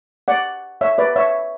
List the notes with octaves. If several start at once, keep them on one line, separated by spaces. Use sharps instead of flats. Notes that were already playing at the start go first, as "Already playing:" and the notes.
D5 F#5
C#5 E5
B4 D5
C#5 E5